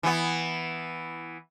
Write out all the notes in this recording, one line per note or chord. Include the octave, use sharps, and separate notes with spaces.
E3 B3